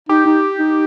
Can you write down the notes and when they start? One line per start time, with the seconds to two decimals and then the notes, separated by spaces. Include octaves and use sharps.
0.09 D#4 G4
0.26 D#4
0.59 D#4